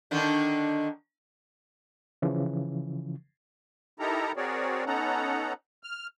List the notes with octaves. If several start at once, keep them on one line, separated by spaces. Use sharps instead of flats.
D3 D#3 D4
C#3 E3 F3
D#4 E4 G4 A4 A#4 A#5
C4 F#4 G#4 A#4 C#5 D5
B3 C#4 D#4 A4 F#5 A#5
F6